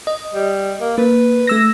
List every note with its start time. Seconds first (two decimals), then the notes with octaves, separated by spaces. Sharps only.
0.07 D#5
0.34 G3
0.81 A#3
0.98 A#3 B4
1.47 A3 E6 A#6